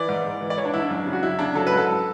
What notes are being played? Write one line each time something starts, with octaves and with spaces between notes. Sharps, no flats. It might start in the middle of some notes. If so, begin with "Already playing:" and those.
Already playing: E3 D5
G#2
G#2
E3
D5
E3 C#5
D4
G#2 E4
D4
F#2
C#3
F#4
F#2 E4
C#3 D4
F#3 A4
B4
G#2
A4